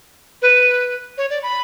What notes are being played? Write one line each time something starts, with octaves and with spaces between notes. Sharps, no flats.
B4
C#5
D5
B5